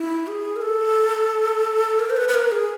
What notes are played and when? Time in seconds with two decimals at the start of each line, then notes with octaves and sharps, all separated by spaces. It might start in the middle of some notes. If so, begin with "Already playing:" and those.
Already playing: E4
0.27 G#4
0.56 A#4
0.61 A4
1.99 A#4
2.10 C5
2.17 B4
2.28 B4
2.34 A#4
2.51 G#4